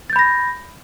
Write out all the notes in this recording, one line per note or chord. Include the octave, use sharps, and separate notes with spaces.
B5 G6 A6 A#6